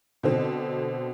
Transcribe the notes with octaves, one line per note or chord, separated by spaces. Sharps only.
B2 D3 C4